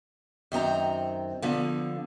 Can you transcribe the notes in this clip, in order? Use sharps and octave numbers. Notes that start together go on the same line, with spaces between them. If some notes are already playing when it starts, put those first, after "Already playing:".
F#2 D#3 C4 A#5
D3 F3 B3